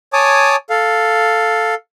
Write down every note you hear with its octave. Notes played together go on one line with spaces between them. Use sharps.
C#5 G#5 A5 D6 D#6
A4 F5